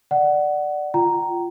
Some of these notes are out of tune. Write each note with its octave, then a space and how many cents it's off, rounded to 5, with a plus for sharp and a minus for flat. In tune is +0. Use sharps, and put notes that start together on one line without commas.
D5 +10 F#5 +15
F4 -15 G5 -35 A#5 +0